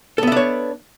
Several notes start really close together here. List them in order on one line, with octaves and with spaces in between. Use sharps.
A4 B3 E5 D4 C#5